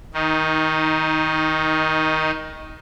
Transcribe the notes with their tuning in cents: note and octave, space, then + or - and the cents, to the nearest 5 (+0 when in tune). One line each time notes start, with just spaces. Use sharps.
D#3 +20 D#4 +0